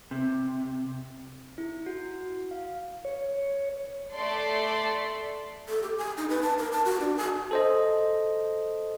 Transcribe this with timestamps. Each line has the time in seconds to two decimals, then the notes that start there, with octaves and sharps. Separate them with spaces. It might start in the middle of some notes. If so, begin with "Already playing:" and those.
0.11 C3
1.58 E4
1.86 F#4
2.51 F5
3.05 C#5
4.14 A3 A4 D5 C6
5.69 A4
5.83 G4
5.98 G#5
6.17 D#4
6.30 B4
6.43 A5
6.58 A#4
6.72 A5
6.85 F#4
7.00 D4
7.17 G#5
7.51 A4 C5 D#5